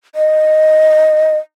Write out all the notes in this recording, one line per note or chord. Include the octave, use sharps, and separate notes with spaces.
D#5